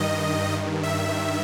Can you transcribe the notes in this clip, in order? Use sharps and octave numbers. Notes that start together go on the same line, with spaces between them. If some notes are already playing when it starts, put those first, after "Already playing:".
Already playing: G2 D#3 D#5
E5